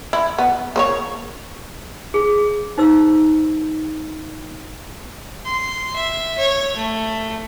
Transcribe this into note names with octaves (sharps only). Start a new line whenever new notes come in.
E4
B3
A#3 C5 C#5
G#4
D#4 C5 E6
C6
E5
C#5
A3